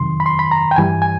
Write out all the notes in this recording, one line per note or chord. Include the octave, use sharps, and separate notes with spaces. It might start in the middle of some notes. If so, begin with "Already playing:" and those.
Already playing: F2 C3 D#3 F#3 C6
B5
C6
B5
A#5
G5
G2 E3 G3 G#5
G#5